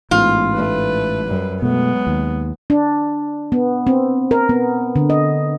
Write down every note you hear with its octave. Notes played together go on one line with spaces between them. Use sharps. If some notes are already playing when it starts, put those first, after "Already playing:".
A1 G#2 B3 F4
A3 B4
F#2 G3
B2 F#3 G#3 A3 B3
D#2
D4
B3
C4
A#4
B3
D3
D#5